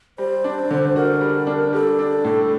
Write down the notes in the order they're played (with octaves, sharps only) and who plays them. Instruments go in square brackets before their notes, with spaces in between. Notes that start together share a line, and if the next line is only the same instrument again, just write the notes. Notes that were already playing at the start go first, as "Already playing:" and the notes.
[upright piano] G3 [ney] C5
[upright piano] D4
D3
[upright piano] F#4 [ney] A#4
[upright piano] G3
D4
[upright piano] G3 [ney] A4
[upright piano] D4
A2